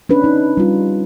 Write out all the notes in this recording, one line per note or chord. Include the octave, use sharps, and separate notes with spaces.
C#4 D4 B4
D#4
G3 F4